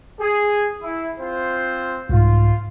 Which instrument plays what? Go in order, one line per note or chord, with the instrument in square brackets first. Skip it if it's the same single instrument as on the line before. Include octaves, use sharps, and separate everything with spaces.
[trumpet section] G#4
E4
C4 F4 C5
[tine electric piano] C2 G#2 [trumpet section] F4